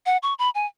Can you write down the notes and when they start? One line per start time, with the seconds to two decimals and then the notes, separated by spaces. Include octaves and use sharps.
0.06 F#5
0.23 C#6
0.39 B5
0.55 G#5